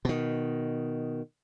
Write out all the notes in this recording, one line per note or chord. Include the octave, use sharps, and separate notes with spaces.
B2 D#3